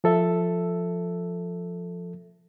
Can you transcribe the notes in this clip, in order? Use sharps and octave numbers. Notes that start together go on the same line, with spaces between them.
F3 A4 E5